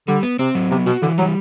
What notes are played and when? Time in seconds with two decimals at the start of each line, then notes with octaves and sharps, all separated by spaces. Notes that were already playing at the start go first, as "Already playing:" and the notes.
0.08 D3 G3
0.23 B3
0.39 C3 C4
0.55 F#3
0.71 C3 B3
0.86 B2 F#4
1.02 D3 E3
1.18 F#3 G3